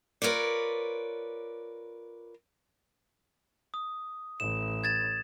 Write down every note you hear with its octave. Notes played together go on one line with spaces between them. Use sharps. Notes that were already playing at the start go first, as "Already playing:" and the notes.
F4 A#4 B4 C#5 D5
D#6
A1 E7
G#6 A6 E7